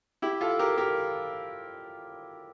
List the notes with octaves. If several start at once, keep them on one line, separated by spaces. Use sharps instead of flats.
E4 G4
F4 A4
G4 A#4
G4 A#4